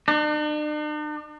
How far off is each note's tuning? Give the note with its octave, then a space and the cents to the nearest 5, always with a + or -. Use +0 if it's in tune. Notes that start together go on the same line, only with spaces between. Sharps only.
D4 +45